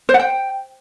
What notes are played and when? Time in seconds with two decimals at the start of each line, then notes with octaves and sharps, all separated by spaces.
0.09 C5
0.14 F#5
0.20 G5